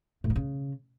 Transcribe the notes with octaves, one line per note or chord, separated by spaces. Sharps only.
A2
D3
C#3